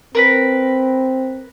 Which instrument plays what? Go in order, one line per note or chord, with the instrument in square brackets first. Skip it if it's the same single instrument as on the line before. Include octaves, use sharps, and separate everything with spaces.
[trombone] C4 [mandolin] A#4 B4 B5